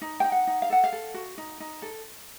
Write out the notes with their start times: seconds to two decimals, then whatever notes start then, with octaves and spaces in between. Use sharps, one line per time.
0.01 D#4
0.20 D#4 G5
0.32 F#5
0.47 D#4
0.62 F5
0.70 A4 F#5
0.84 F5
0.93 A4
1.14 F#4
1.38 D#4
1.60 D#4
1.82 A4